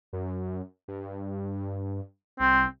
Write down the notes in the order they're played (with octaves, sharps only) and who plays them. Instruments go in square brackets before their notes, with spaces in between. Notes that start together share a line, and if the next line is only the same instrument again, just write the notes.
[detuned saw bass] F#2
G2
[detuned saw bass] C2 [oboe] C4